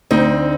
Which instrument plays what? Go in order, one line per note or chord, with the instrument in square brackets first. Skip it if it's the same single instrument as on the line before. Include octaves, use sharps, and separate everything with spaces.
[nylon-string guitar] D2 [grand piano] C4 D#4